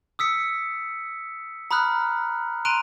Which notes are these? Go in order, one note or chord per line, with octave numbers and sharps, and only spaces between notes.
D#6 E6 B6 C#7
A#5 B5 D#6 F6 F#6
A#5 C6 F#6 D7 D#7 F7